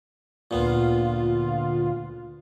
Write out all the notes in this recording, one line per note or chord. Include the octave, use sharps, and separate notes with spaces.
D2 A#2 B3 F4